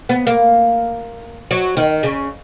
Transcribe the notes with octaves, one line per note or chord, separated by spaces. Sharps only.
B3
A#3
F#3
D#3
C#3